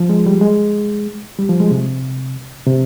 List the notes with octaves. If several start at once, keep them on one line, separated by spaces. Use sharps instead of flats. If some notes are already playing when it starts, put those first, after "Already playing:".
Already playing: F3
G#3
G3
G#3
G3
F3
G#3
C3
C3